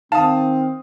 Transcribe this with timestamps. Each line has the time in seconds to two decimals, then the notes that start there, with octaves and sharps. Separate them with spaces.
0.12 D#3 C4 F5 A5 D#6